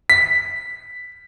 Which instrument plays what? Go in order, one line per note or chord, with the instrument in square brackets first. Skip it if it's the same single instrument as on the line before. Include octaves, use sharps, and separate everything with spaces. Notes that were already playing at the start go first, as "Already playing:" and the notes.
[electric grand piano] B6